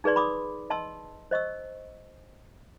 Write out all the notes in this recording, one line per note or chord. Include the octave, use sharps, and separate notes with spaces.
D#4 G#4 B4 D5 C6
B5 D6 D#6
D#5 A5 C6 E6
C5 D#5 C#6 E6